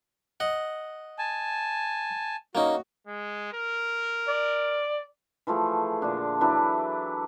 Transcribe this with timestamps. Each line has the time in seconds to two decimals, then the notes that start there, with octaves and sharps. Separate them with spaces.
0.40 D#5 F#5
1.18 G#5 A5
2.55 A#3 C#4 D#4 F#4
3.07 G#3
3.53 A#4
4.29 D5
5.47 E3 F3 A3 G#4
6.02 A#2 D3 D4
6.41 E3 F#3 D4 E4